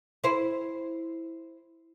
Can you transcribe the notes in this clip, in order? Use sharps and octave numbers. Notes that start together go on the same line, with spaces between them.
E4 C5